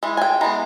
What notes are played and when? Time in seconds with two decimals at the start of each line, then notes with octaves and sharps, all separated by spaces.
0.03 E3 G#3
0.17 G#5
0.22 G5
0.41 E3 G#3 B3 A#5